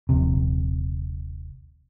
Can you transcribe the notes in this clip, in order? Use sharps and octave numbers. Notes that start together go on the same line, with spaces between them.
D#1 A#1 C3